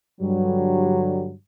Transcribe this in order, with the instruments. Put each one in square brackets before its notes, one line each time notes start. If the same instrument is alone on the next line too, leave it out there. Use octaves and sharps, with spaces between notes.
[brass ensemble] G2 D3 F#3 G3